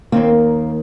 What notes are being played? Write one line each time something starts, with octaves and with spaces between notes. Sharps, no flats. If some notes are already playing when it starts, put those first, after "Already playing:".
D#2 D#3 A#3 C4